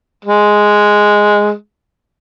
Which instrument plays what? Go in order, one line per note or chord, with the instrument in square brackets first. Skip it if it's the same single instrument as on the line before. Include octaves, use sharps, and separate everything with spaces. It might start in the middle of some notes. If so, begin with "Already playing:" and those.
[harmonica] G#3